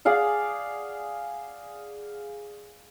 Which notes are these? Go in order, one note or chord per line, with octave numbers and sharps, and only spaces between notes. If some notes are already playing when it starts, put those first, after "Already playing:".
G#4 D5 F5 F#5